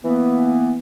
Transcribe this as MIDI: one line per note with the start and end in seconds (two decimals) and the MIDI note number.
0.04 0.78 52
0.04 0.78 58
0.04 0.78 59